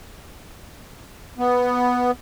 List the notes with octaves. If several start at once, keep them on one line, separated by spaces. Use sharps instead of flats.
B3